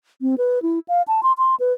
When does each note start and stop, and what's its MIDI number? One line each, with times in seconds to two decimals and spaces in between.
0.22 0.35 60
0.38 0.62 71
0.62 0.79 64
0.88 1.02 77
1.08 1.23 81
1.23 1.32 84
1.38 1.55 84
1.60 1.73 71